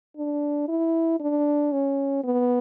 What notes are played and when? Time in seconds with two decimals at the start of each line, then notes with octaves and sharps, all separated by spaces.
0.17 D4
0.68 E4
1.20 D4
1.72 C#4
2.24 B3